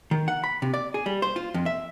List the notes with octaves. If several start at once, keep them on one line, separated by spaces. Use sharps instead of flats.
D#3
F#5
B5
C3
D5
G#4
G3
C5
F4
F2
E5